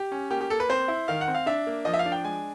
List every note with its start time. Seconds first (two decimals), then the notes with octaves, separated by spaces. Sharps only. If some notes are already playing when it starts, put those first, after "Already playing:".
Already playing: G4
0.12 C#4
0.31 A#3 G4
0.41 G4
0.50 A#3 A4
0.60 B4
0.69 C4 C5
0.88 E4
1.08 D#3 F5
1.21 F#5
1.28 C4
1.34 F5
1.46 D4 E5
1.67 A#3
1.85 F3 D#5
1.94 E5
1.99 F5
2.06 D4
2.12 G5
2.24 G#3 G#5